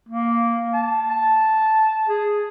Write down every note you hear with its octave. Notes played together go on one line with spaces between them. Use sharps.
A#3
A5
A5
G#4